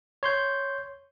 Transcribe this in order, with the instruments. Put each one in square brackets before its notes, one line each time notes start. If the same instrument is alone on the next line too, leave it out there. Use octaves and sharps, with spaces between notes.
[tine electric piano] C#5 C6 G6